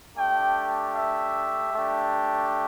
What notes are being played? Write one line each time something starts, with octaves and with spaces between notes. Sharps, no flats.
A3 D4 G4 G5
E5
A3 D4 G4